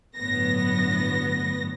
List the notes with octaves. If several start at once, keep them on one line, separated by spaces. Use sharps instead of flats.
G1 A2 F#3 B3 A#6